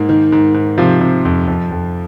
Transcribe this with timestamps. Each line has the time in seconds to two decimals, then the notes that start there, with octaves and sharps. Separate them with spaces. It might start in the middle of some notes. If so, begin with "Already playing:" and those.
Already playing: G#2 A#3
0.09 D#3
0.32 G#2
0.54 G#2
0.78 C3 F3 F4
1.01 C3
1.25 F2
1.47 F2
1.71 F2